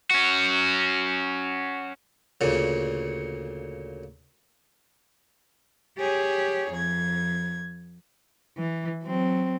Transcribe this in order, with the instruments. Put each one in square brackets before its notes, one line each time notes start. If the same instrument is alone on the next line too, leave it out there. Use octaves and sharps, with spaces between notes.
[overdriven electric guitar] C#4 F#4
[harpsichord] D2 A#2 C#3
[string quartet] G4 G#4 C#5
F2 G#6
[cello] E3
F#3 C4